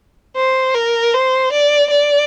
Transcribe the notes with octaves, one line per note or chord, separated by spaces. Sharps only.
C5
A#4
C5
D5
D5